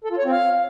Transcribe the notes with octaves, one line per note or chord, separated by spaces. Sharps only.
A4
F4
C#5
C4
F5